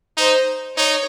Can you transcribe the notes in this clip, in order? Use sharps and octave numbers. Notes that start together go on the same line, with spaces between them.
D#4 C5
D#4 C#5